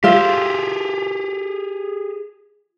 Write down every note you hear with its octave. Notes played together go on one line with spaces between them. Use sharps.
F4 G4 G#4 C5 E5